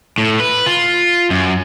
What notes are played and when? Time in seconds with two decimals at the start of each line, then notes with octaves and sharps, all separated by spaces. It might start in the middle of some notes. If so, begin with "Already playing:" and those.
0.18 A2
0.40 B4
0.66 F4
1.30 F#2